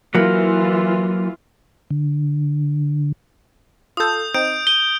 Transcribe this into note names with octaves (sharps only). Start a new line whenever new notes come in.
E3 F#3 A#3 F4
D3
F4 A4 D#6 G6
C4 D#4 D#6 G6 D7
D#7 G7